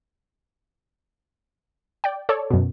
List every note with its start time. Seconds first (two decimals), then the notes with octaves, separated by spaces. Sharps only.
2.04 D5 G5
2.29 A4 C#5 D5
2.50 F#2 B2